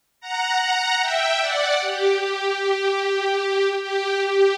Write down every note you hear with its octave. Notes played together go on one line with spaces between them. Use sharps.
F#5 A#5
F#5 A#5
E5 G5
D5 F#5
G4
G4
G4
G4